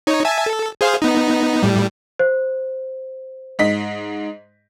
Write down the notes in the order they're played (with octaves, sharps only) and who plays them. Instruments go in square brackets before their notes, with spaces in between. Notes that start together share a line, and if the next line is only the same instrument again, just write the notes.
[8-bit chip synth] D#4 C#5
E5 G#5 A5
A4
G#4 C5 F5
B3 D#4
A2 G3
[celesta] C5
[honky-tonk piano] G#2 D#5 B6